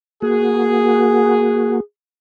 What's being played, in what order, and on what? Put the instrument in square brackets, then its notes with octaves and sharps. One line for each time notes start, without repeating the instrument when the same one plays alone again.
[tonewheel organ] A#3 F#4 [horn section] G#4